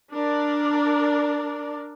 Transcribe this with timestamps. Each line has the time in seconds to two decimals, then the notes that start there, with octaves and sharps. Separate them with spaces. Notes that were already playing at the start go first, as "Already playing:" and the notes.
0.12 D4 A#4 D5